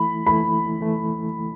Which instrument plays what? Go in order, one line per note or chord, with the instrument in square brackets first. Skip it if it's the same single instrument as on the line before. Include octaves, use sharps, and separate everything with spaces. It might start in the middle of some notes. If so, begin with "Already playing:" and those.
Already playing: [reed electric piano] E3 A3 E4 [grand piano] B5
[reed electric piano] E3 A3 E4 [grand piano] B5
[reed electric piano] E3 A3